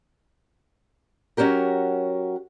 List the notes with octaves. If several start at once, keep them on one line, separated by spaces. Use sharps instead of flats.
F#3 C#4 F#4 G4 A#4